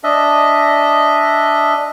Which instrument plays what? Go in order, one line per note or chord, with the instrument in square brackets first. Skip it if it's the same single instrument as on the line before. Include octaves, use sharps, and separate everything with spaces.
[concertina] D4 D#5 E5